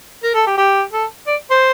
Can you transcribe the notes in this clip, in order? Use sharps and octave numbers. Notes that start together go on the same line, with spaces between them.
A#4
A4
G4
G4
A4
D5
C5